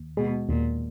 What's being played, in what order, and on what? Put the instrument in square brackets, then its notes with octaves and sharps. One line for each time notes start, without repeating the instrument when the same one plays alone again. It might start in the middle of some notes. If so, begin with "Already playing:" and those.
Already playing: [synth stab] D#2
[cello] B2 [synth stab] G#3
[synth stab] D#2 [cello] A#2